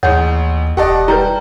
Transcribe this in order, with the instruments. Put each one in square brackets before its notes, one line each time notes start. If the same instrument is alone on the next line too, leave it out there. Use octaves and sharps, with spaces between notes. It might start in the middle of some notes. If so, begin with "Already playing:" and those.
[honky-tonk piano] A1 G#4 [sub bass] D#2 [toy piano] C#5 F#5
[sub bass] E1 [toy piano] G4 A5 [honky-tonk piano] D5 D#5 F#5
[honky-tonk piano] G3 G6 [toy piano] B4 A#5